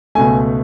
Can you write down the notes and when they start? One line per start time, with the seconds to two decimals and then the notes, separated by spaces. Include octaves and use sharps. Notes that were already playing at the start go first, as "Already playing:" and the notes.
0.15 C#2 B2 A3 G#5